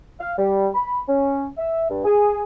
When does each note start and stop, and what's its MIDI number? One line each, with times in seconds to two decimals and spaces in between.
0.20 0.32 77
0.37 0.68 55
0.75 1.00 83
1.08 1.46 61
1.58 1.87 76
1.89 2.04 43
2.05 2.41 68